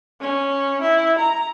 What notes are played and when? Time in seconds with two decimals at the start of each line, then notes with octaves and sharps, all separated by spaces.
0.21 C#4
0.82 E4
1.19 A#5